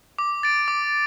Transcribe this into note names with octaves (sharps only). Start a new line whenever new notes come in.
D6
A6 D7
D6